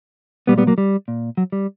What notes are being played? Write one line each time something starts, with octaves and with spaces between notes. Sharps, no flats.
A#2 G3 B3
G3 B3
F#3 A#3
G3
A#2
F#3
G3